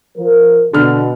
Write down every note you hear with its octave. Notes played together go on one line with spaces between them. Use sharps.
F3 A#4
B2 D3 D4 F6